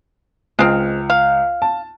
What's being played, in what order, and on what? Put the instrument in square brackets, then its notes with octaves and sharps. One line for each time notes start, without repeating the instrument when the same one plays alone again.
[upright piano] C#2 F6 [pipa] G#3 C4
[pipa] F5
[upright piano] A5